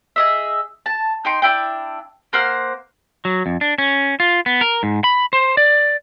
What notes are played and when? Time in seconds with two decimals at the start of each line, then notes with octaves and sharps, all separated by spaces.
0.16 G#4 D#5 E5
0.86 A5
1.25 D#4 G5 C6
1.42 D4 E4 G5
2.33 A#3 C5 F#5 F6
3.25 F#3
3.46 F2
3.61 D4
3.78 C#4
4.20 F4
4.46 B3
4.61 A#4
4.83 G#2
5.04 B5
5.33 C5
5.57 D5